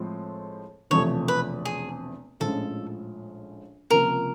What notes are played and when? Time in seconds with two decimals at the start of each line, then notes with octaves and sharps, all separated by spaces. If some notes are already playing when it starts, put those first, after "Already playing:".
Already playing: A2 F3 G#3 C4
0.90 E1 E2 C3 F3 A3 C#5
1.28 B4
1.65 G#4
2.40 A#1 A2 F3 G#3 C#4 A4
3.90 C#2 C3 F3 A#3 A#4